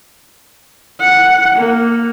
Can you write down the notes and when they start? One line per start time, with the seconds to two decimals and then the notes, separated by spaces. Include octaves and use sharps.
1.00 F#5
1.56 A#3